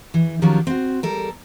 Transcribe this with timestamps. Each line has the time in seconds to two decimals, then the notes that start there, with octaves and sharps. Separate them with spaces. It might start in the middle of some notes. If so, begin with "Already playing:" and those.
0.14 E3
0.42 D#3 F3 F#3 C#4 G4 C#5
0.67 C4 F#4
1.03 G3 A4 A#4